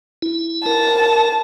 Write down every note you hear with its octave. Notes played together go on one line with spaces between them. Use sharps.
E4
A#4 A5